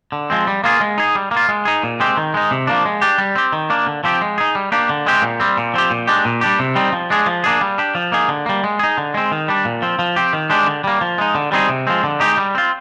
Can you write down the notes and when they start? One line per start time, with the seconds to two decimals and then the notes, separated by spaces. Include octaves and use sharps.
0.12 D3
0.30 F3 G#3 C4
0.47 G3
0.64 A#3 F4 G#4
0.81 G#3
0.98 D#4 G#4
1.15 G3
1.31 A#3
1.37 F4
1.49 G#3
1.65 D#4 G#4
1.83 A#2
2.00 G#3 C4 G4
2.17 D#3
2.34 G#3 D#4
2.51 C3
2.67 F3 A#3 D4
2.85 G#3
3.02 D4 G4
3.18 G3
3.35 C4 G4
3.52 D#3
3.70 A#3 D4
3.87 D3
4.04 F3 C4 G4
4.21 G#3
4.38 D#4 G#4
4.55 G3
4.72 A#3 D4 G4
4.89 D3
5.06 G#3 C4 G4
5.22 A#2
5.40 G3 C4
5.58 A#2
5.74 F3 C4 G4
5.90 A#2
6.07 G#3 D4 G4
6.25 A#2
6.41 G3 D4 G4
6.59 C3
6.75 G3 C4 D#4
6.92 F3
7.10 G#3 D4 G#4
7.26 F3
7.44 A#3 D4 G#4
7.61 G3
7.78 D4 G4
7.95 F3
8.12 A#3 D#4 G#4
8.28 D3
8.46 G3 A#3
8.64 G#3
8.79 D#4 G#4
8.98 D3
9.14 G#3 C4
9.32 D#3
9.48 G3 D4
9.65 A#2
9.82 F3 C4
9.99 F3
10.16 C4 G4
10.33 D#3
10.50 G#3 D4 G4
10.67 D3
10.84 G3 A#3
11.01 F3
11.18 G#3 D#4
11.35 D3
11.52 G3 C4 D#4 G#4
11.69 C3
11.87 F3 G#3 C4
12.04 D3
12.20 G#3 D#4 G4
12.37 G3
12.55 C4 F4